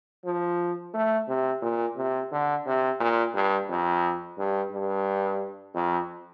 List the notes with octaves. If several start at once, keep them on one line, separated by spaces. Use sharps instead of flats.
F3
A3
C3
A#2
C3
D3
C3
A#2
G2
F2
G2
G2
F2